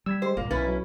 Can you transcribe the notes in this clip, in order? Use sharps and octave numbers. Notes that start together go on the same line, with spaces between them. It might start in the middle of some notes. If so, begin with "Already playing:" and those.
G3 E6 G#6 B6
G#3 G4 C5
G1 C2 A#2 A#3
B1 C#4 E4 B4 F6 A6
F#3